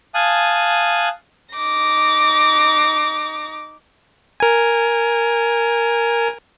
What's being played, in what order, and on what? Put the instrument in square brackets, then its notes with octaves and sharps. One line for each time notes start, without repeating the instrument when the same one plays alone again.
[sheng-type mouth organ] F5 G#5 A5 D#6 F#6
[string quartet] D#4 D6 A#6
[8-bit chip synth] A#4 G#5